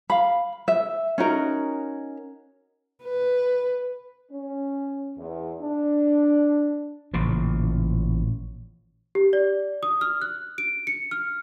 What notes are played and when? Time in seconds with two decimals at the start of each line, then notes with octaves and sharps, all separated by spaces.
0.10 F5 B5
0.68 E5
1.18 C#4 D#4 F#4 A#4
3.04 B4
4.31 C#4
5.18 E2
5.60 D4
7.14 A1 A#2 C#3 F3
9.15 G4
9.33 D5
9.83 D#6
10.01 F6
10.22 F#6
10.58 D7
10.87 C#7
11.11 F6